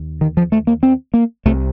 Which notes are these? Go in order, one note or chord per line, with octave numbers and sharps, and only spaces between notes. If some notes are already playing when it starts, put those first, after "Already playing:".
Already playing: D#2
D#3
F3
A3
A#3
C4
A#3
C2 C3 A3